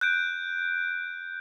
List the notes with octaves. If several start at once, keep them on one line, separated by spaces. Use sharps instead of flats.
F#6 G6 D7